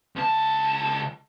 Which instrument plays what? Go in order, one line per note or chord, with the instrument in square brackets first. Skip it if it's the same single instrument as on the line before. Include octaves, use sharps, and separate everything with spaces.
[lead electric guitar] C#2 A5